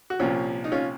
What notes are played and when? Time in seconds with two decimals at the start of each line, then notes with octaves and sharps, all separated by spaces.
0.10 F#4
0.19 C2 A#2 F3 C#4 F4
0.64 D#4
0.72 C#4 F4